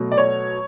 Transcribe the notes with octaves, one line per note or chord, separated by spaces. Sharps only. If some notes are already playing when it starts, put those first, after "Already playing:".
Already playing: B2 F#3 A3
D5
C#5